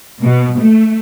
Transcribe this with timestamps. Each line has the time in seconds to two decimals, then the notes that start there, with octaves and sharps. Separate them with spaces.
0.22 B2
0.60 A3